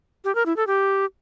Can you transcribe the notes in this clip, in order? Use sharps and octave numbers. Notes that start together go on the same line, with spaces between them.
G4
A#4
E4
A4
G4